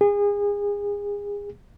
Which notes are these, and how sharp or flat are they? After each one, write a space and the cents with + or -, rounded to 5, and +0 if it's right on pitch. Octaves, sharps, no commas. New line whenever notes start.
G#4 -30